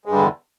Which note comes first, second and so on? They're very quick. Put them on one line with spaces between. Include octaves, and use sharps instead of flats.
G#3 G2 G3 D3 E2